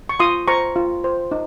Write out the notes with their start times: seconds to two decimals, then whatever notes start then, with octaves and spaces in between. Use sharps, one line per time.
0.09 C#6
0.20 F4 C6 D#6
0.48 C5 A#5 C#6
0.76 F4
1.04 C5
1.31 D#4